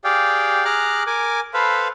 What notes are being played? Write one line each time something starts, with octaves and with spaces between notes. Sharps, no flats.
G4 G#4 D5 F5 G5
G#4 A#5 D6 F6 F#6
A#4 G#5 D6
A4 B4 C5 F5 B5